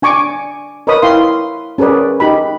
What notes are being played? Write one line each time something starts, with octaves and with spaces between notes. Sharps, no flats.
D4 G#5 C#6 D6
A#4 B4 C#5 D#5 B5 D#6
E4 F5 G5 C6
C#4 G#4 A#4 B4 D5
D#4 G4 B5